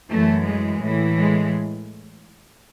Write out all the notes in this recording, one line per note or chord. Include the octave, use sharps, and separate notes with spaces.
F#2 E3 A3
G#3
A2 E3
G#3